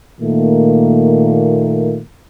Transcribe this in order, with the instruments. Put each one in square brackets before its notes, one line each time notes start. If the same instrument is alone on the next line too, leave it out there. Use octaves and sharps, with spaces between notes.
[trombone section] A#2 D#3 A3 A#3